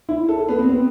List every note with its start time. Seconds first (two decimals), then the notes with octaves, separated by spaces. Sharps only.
0.09 E4
0.29 A4
0.39 A4
0.49 B3
0.59 C4
0.69 B3